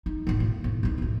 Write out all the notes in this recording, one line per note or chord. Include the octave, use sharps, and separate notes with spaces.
D#4
A2 D3
A#3
A2
D1 D#4
C#2 A2